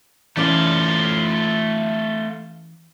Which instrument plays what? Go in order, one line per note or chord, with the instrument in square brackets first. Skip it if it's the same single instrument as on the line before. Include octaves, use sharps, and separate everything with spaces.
[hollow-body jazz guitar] E3 C#4 D5 [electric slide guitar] A3 F4